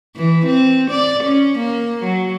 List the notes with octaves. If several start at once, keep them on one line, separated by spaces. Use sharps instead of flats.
E3
C4
D5
C#4
A#3
F#3